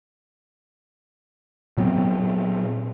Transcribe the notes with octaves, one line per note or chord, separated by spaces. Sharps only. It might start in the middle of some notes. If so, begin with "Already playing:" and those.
A#2 F#3 B3 C4